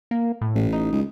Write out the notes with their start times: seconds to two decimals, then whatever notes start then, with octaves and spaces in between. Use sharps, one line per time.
0.11 A#3
0.41 A2
0.55 A1
0.73 D#4
0.92 C#2